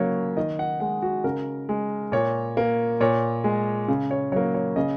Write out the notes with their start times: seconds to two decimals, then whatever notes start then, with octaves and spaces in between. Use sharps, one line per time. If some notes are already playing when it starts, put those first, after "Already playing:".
Already playing: C#3 F#3 A#3 C#5
0.37 D#3 D#5
0.59 F#5
0.80 G#3 F#5
1.02 F#4
1.24 C#3 A#4
1.69 G#3
2.12 A#2 C#5
2.57 A#3
3.00 A#2 C#5
3.44 G#3
3.88 C#3
4.11 C#5
4.32 F#3 A#3 C#5
4.54 C#5
4.76 C#3 D#5